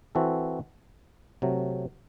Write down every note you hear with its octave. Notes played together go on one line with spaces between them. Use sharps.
E3 C4 F#4 A4
C3 F#3 A3